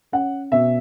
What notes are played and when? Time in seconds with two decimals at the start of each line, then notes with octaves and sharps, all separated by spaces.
0.12 C#4 F#5
0.52 B2 E5